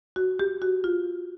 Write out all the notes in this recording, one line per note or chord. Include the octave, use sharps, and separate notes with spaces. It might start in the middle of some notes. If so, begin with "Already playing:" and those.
F#4
G4
F#4
F4